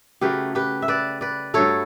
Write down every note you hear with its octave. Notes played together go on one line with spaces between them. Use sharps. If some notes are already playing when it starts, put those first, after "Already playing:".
C#3 F#3 A3 G4 B4
G4 B4
E5
B4 D5
B4 D5
G2 F#3 A3 A4 C#5